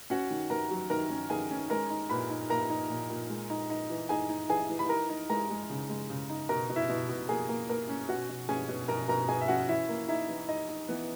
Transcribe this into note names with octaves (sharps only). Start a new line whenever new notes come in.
C#4 F#4 F#5
D#3
D#3 A#4 A#5
F#3
D#3 A#4 A#5
C#4
D#3 G#4 G#5
C#4
G#3 A#4 A#5
D#4
A#2 B4 B5
D#4
A#2 A#4 A#5
D#4
A#2
A#2
G#3
D#4
D#4
E3
D#4 G#4 G#5
D#4
E3 G#4 G#5
E3
B5
D#4 A#4 A#5
D#4
G#3 A#4 A#5
G#3
C#3
G#3
C#3
D#4
B2 A#4 A#5
B2
E4 E5
B2
B2
A#3 G#4
A#3
A#3 A#4
C#4
B2 F#4 F#5
B2
C#4 G#4 G#5
B2
B2 A#4 A#5
B2 A#4 A#5
B2 G#4 G#5
E5
C#4 F#4 F#5
E3 E4 E5
A#3
D#4 E4 E5
E3
D#4 D#5
D#4
E3 B3 B4